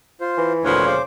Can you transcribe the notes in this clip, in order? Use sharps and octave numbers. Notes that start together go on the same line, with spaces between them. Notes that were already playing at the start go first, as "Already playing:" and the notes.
F4 C5
E3
D2 A#2 F3 B4 C#5
C#3 C5 D6